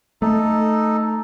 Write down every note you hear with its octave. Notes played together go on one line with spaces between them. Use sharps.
A3 D#4 A4